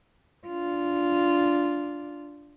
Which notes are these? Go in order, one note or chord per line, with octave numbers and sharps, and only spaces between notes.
D4 F4